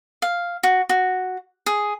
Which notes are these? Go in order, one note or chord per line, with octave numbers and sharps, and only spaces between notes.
F5
F#4
F#4
G#4